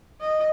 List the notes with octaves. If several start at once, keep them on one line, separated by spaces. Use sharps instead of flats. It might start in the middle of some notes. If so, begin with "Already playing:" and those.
D#5